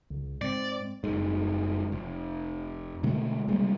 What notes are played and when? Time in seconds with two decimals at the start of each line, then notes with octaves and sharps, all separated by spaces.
0.10 C#2 C#3
0.42 G#2 G#3 C4 D5
1.04 F#1 G#2
1.92 F1
3.03 B2 D3 G#3 A3
3.48 C3 G3 G#3 A#3